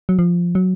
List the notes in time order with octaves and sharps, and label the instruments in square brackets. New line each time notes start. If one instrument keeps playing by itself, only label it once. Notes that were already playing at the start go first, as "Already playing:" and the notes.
[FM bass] F#3
F3
F#3